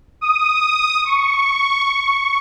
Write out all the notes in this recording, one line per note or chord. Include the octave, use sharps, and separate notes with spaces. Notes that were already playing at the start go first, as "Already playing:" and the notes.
D#6
C#6